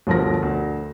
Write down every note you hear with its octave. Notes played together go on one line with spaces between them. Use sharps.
G1 D2 F3 A#4 A#6
D2